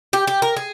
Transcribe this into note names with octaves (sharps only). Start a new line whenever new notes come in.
G4
G4
A#4
G#4